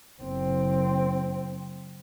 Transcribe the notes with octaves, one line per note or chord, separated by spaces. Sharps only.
F#1 C4